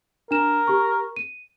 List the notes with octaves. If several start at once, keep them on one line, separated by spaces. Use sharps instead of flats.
D4 A#4 E7
G4 C#6
D#7